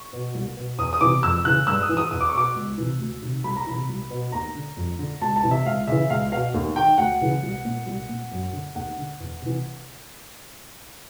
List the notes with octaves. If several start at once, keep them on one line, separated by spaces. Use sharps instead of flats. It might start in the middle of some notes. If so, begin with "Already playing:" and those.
Already playing: C#6
B2
C2
B2
E2 D#6
D#6
C3 E3 D6
F2 E6
C#3 E3 F#6
G2 E6
D#6
E3
D#6
E2 D#6
D6
C#6
B2 D6
C#2
C3 E3
D2
C3 D#3
C2 B5
A#5
C3 E3 B5
C2
B2
D#2 A#5
D3
F2
D3
C#2 A5
A5
C3 E3
E5
C#2 F5
C#3 E3 E5
C#2 F5
B2 F5
D#2
D#3 G5
D2 F#5
C#3 E3
C2
A#2
C2
A#2
F#2
D3
D#2 F#5
D3
E2
C3 E3